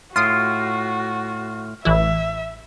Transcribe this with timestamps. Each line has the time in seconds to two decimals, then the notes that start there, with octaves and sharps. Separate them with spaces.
0.16 A2 F4 F#4 C6 D#6
1.85 A1 E3 E4 E5